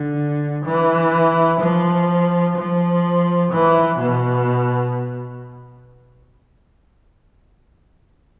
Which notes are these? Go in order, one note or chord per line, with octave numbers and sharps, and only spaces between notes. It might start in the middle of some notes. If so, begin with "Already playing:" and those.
Already playing: D3
E3
F3
F3
E3
B2